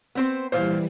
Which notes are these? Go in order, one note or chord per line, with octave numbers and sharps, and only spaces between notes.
B3 C4 C5
A#2 E3 G3 C5 F5